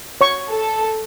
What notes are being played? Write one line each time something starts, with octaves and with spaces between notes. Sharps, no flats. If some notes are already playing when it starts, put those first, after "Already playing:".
C#5 C#6
A4